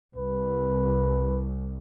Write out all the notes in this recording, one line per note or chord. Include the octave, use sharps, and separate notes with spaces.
C2 B4